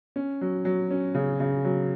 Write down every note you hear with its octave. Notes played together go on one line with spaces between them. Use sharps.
C#4
F#3
F#3
C#4
C#3
C#3
F#3